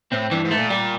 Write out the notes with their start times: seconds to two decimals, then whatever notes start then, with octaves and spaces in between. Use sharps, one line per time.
0.12 A2 C4
0.31 G2 E3
0.45 G#2
0.51 A3
0.58 A#2
0.70 G3